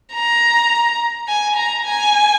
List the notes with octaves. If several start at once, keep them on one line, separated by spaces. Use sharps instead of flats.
A#5
G#5
A#5
G#5